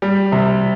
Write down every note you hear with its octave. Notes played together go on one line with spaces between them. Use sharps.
G3
C3